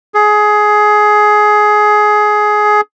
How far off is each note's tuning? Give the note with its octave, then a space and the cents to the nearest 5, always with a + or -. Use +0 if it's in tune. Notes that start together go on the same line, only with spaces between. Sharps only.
G#4 +15